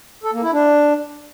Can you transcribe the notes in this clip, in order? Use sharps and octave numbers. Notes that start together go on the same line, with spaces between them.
A4
A#3
E4
D4